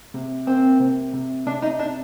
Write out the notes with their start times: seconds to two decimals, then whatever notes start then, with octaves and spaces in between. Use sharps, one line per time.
0.14 C3
0.47 A#3 C4
0.80 C3
1.13 C3
1.47 C3 D4
1.62 D#4
1.79 C3 D4